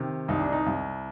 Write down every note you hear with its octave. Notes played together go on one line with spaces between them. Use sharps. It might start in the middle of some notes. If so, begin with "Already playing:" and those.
Already playing: C3 D#3
C2 D#4
D4
D#4
C2